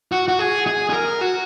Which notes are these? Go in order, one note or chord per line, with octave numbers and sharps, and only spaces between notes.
F#4
F#4
G#4
G#4
G#4
A#4
F#4